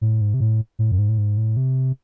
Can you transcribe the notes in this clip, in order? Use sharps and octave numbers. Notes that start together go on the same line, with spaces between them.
A2
G#2
C3
A2
A2
F#2
G#2
A2
G#2
A2
C3